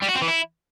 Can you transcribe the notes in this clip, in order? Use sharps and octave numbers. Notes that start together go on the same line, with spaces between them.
G3
F#4
C4
E3
E4